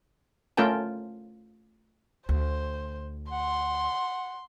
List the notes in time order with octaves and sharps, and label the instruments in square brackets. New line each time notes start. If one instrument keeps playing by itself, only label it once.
[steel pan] A3 C#4 F4 A#4 G5 A5
[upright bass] D2 [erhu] C5
[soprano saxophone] F#5 [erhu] C6